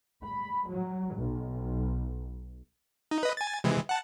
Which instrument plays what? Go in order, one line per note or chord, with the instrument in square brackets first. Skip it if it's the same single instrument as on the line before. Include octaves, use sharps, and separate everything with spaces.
[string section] B5
F#3
B1
[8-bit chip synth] D#4
B4 D#5
G#5 A6
C3 E3 G#3
F#5 A5